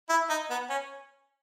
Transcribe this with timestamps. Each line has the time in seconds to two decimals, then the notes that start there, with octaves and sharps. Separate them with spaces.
0.09 E4
0.30 D#4
0.50 B3
0.70 C#4